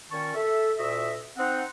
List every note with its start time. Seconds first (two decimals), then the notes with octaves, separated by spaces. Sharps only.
0.11 A#2 D#3 C#4 A5 C#6
0.35 A4 E5
0.78 D2 A#2 F#4 D#5 E5
1.37 C4 D#4 F#5